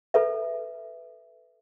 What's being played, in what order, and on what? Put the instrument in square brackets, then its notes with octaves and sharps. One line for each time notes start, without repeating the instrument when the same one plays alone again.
[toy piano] A4 B4 E5